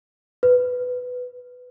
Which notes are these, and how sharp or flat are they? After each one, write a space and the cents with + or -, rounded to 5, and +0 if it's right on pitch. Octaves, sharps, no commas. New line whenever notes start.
B4 +10